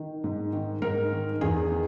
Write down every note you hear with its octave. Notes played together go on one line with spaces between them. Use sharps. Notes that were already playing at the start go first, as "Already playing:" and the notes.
Already playing: D#3
G#2
D#3
G#2 A#4
D#3
E2 G#4
D#3